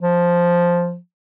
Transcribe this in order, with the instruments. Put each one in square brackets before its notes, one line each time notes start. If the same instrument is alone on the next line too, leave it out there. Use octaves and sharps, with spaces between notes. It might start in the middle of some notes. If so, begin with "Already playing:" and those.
[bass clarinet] F3